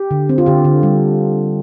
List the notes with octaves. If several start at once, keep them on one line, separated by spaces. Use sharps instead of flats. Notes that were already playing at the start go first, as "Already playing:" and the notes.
Already playing: G4
D3
C4
F4
D3 G4
D3
G3